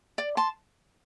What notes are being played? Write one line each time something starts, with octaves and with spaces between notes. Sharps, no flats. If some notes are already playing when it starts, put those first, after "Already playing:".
D5
A5 C6